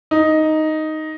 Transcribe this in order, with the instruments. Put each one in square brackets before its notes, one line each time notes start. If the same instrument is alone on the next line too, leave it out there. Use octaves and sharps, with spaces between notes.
[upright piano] D#4